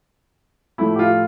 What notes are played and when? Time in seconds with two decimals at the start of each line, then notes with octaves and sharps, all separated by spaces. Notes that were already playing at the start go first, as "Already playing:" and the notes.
0.78 A2 F3 A3 E4
0.95 G4
0.99 F4